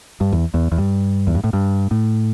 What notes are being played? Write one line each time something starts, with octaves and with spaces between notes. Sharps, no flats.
G2
E2
E2
E2
G2
E2
G2
A2
G2
A2